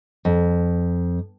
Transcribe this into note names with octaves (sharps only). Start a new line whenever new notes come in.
F2